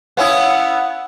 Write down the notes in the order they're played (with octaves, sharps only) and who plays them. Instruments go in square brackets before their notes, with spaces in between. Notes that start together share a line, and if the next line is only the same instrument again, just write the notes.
[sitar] B3 C#4 E4 [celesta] F5 D#6 [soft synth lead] F#5